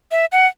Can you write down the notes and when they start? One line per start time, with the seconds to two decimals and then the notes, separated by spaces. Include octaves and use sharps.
0.11 E5
0.32 F#5